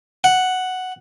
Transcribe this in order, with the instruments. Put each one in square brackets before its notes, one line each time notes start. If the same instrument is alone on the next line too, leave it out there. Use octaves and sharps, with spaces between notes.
[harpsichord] F#5